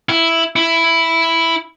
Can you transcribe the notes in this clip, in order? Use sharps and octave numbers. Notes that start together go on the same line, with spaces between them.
E4
E4